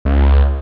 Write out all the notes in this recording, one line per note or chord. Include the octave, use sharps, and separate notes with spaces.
C#2